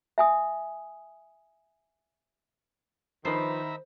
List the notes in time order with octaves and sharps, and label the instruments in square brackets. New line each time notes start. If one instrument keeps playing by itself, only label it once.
[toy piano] E5 G#5 D#6
[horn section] D#3 [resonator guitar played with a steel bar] F3 B4 [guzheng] C5 [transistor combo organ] E5 A#5 B5